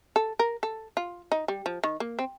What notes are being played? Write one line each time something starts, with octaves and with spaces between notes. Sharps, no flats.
A4
A#4
A4
F4
D#4
G3
F3
D#3
A#3
C4